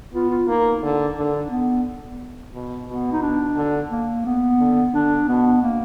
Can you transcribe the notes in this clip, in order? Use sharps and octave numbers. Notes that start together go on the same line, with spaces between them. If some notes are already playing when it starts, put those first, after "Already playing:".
B3 F4
F4
A#3 D#4
D3
D3 D4
B3
B2
B2 B3
D#4
D4
D3
A#3
B3
D3
D3 D4
B2 B3
A#3